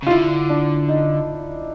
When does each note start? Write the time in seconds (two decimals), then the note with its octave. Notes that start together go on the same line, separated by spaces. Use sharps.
0.03 C#3
0.07 F4
0.11 D3 E4
0.49 D4
0.88 D#4